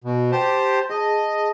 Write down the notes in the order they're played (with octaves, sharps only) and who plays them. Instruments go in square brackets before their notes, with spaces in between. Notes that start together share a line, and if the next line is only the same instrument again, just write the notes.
[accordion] B2
G4 C5 A5
[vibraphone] G#4 A5 [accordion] D#5